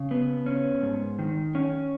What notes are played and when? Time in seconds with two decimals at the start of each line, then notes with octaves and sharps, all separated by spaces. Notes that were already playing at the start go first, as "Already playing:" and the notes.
Already playing: C#3
0.11 B3
0.46 C#4
0.82 G#2
1.19 D#3
1.55 C#4